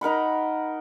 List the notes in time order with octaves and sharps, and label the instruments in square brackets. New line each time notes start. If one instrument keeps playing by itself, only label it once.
[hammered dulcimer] D#4 A#4 F#5 B5